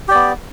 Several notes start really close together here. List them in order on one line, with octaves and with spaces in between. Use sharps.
G4 D5 B3